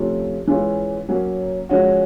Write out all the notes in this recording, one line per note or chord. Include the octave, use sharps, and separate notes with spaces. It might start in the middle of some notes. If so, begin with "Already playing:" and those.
Already playing: C3 F3 A3 C#4 F4
E3 G#3 C#4 F4 G#4
F#3 A#3 C#4
F3 G#3 C#4 F#4